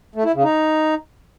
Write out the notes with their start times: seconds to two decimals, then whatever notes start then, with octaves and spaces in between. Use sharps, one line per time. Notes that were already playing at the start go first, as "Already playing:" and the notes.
0.15 A3
0.25 E4
0.34 C#3
0.44 D#4